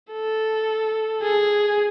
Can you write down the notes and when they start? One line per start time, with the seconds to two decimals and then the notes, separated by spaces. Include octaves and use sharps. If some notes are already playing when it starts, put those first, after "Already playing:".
0.13 A4
1.23 G#4